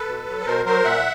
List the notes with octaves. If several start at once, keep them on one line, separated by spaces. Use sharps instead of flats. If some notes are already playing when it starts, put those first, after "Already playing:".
Already playing: A4 B4
B2
F#3
B4
B2 A#4 C5
F#3 A#4 C5
A#2 E5 F#5